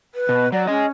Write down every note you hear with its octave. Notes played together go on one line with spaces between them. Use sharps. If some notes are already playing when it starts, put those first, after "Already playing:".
B4
B2
F#3 D5
C#4 G#4 D#5